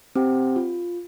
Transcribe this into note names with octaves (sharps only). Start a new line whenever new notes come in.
C4 G4 C5 G5
F4